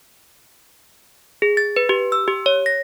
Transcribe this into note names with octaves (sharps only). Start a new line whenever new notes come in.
G#4
A6
B4
G4
E6
G4
C#5
A#6